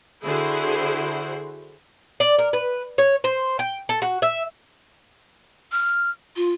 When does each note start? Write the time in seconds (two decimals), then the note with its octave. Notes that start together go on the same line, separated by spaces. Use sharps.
0.24 D3 E4 F#4 G#4 C5
2.20 D5
2.38 A#4
2.53 B4
2.98 C#5
3.24 C5
3.59 G5
3.89 A4
4.02 F#4
4.22 E5
5.72 F6
6.36 F4